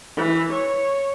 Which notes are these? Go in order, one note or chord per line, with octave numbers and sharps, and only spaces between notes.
E3
C#5